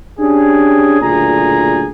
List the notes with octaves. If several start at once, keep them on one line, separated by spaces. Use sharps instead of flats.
C#4 D4 G4 G#4
F#1 D2 A#2 G#4 A#5